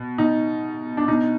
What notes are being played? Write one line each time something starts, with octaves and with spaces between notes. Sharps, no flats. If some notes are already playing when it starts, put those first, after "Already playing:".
Already playing: B2
B2 D#4
D4
B2 D#4